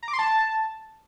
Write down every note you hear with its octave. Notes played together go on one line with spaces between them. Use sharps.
A#5
D6
C6
A5